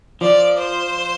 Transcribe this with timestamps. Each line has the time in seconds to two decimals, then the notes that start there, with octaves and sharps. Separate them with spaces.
0.21 F3 D5
0.59 C5